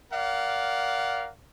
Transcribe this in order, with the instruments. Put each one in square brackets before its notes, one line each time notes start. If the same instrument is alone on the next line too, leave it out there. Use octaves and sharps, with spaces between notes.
[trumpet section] A#4 D5 F5 F#5